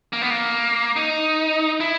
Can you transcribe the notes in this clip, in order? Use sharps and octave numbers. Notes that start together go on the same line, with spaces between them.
A#3
B3
A#3
D#4
E4